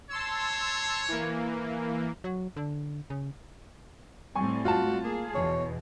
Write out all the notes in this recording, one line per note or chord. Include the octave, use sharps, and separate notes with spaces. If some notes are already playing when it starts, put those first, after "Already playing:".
C#5 A5 C6 E6
E3 A#3
F#3
D3
C#3
A2 G3 C4 G#5 C#6
F4 F#4 A5
A#3 G#4
E2 B2 C#5